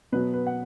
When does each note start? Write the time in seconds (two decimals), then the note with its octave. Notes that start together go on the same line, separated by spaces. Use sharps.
0.12 B2 F#3 B3 B4
0.33 B4
0.47 F#5